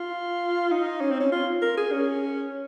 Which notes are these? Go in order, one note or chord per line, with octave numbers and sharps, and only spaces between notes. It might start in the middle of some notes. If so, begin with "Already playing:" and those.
Already playing: F4
D#4
C#4
C4
C#4
F4
A#4
G#4
C#4